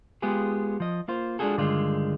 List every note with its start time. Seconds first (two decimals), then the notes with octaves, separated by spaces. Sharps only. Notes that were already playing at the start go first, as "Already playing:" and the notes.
0.22 G#3 B3 F4 G4 G#4
0.80 F3 D#5
1.08 A#3 F4 C5
1.39 G#3 D4 F4 F#4 G#4 A4
1.57 G2 D3 D#3 G#3 F4